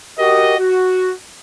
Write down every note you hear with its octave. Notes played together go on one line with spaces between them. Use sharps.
F#4 G4 A#4 D#5
F#4